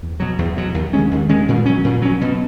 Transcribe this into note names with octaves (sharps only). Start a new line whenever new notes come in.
E2
B2 F#3
E2
B2 F#3
D#2
D#3 G#3 C#4
D#2
D#3 G#3 C#4
A#2
F#3 C#4
A#2
F#3 C#4
B2